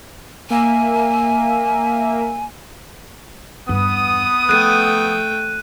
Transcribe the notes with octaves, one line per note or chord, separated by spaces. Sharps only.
A#3 E5 G#5
E2 G2 B3 D#6
F3 A3 G5 F#6 D#7